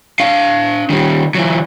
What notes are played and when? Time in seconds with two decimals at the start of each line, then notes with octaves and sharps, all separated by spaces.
0.20 D4 F5
0.90 D#3 G3
1.35 E3 F#3